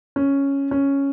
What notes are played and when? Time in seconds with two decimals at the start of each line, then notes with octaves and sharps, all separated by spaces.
0.16 C#4
0.71 C#4